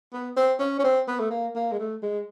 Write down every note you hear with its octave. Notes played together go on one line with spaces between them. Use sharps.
B3
C4
C#4
C#4
C4
B3
A3
A#3
A#3
G#3
A3
G#3